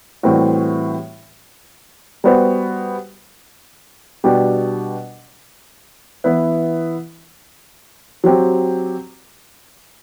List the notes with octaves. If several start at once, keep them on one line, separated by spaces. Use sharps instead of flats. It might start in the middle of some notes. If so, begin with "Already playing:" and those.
A2 E3 G3 C4 F#4
G3 B3 F#4 C5
B2 G3 D4 G4
E3 B3 E4 B4
F#3 C4 G4